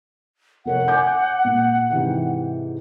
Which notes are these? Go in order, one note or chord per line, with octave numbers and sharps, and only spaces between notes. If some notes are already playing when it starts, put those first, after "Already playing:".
F1 A#4 C#5 F#5
G#5 D6 G6
A#2
G#2 C3 E3